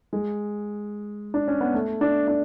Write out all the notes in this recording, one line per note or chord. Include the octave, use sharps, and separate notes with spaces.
G#3
D4
C#4
B3
A3
D4
D4